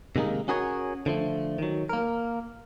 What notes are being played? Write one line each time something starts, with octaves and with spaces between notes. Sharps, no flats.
C3 D#3 G#3 A#3 D#4
C#4 F#4 G#4 A#4 C5 C#5
D3 F3 A3
D#3 F#3
A#3 A#4